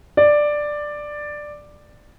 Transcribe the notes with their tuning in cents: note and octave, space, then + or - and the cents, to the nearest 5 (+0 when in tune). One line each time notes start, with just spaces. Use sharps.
D5 +10